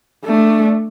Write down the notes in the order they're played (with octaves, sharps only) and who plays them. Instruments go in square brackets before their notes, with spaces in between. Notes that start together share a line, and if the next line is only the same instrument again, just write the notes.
[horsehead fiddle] A3 D4